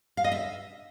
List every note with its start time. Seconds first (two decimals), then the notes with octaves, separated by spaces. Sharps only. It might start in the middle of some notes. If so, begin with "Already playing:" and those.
0.17 F5
0.24 D#5
0.32 E5